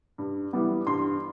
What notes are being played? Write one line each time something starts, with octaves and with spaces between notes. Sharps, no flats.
G2
E3 G3 B3
G2 C6